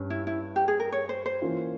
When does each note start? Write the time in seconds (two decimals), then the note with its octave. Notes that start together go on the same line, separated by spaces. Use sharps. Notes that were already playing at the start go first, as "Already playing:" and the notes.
Already playing: G2 G3 C#4
0.10 E4
0.27 E4
0.56 G4
0.68 G#4
0.80 A#4
0.92 C#5
1.09 C5
1.26 C5
1.42 E3 A#3 C#4 F4